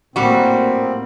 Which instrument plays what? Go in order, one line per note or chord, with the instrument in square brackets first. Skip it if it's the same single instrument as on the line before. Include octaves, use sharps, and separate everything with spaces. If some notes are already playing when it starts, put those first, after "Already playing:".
[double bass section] A2 A#3 [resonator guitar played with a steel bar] G3 F#4 [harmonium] C4